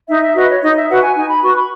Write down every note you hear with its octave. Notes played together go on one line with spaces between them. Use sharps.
D#4 E5
E5
F#4 B4 D#5
C#5
D#4 D#5
E5
F#4 B4 F#5
G#5
D#4 G#5
B5
F#4 B4 C#6
B5